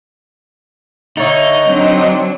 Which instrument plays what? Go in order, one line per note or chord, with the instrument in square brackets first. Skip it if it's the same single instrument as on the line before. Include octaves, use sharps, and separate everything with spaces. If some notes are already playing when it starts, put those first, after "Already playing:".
[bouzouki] D3 C#5 [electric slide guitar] D#4 [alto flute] E5
[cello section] F#3 D4 [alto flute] C4